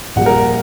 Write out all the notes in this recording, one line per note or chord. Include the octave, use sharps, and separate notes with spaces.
A#1 A#2 G3 F#5
A#4